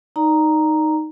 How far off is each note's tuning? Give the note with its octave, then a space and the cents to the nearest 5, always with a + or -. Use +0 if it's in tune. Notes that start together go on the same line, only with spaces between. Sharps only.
D#4 +0 D5 +0 A#5 +0